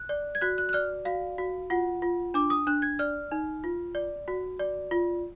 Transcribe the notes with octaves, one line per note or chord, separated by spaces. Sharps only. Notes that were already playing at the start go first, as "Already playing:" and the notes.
Already playing: F#6
D5
G#6
F#4 F#6
F#6
F#6
D5 F6
F#4 F5
F#4
F4 F#5
F4
D4 D6
D#6
D4 F#6
G#6
D5 F6
D#4
F4
D5
F#4
D5
F4